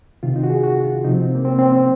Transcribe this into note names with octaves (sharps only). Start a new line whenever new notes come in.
C3 D#3 F4
D#4
F#4
G#4
F#4
F4
C3 F3 D#4
C4
C4
A#3
C4
C4
C4